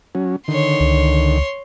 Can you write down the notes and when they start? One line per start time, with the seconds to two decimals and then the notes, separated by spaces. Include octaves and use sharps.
0.15 F#3 C#4
0.48 D3 D#3 C#5 C6
0.80 C#2